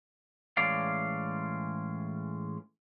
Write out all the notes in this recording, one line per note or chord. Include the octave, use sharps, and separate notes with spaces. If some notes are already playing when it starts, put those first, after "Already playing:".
A2 E3 G#3 C#4 D5 F5